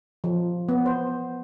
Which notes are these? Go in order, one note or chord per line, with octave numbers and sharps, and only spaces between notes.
F3
B3
C5